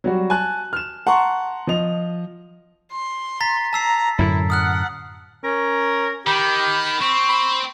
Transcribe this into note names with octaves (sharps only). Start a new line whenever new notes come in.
F#3 G3 F#4
G#5 A5 F#6
F6 E7
F#5 A5 A#5 C6 C#6
F3 D#5 F7
C6
A#5 A6 B6
A5 A#5 E6 C7
F#2 A2 D3 E4
F#5 D#6 F6 F#6
C#4 A#4
D#3 G4 B5
C4 C#6
B5